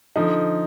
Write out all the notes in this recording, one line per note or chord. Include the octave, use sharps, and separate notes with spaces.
D3 F3 D#4